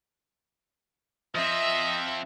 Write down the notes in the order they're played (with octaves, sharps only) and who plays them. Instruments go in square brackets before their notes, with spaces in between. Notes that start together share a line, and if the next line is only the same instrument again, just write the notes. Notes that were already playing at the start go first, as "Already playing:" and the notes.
[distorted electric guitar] F3 C4 [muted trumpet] D#5 [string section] E5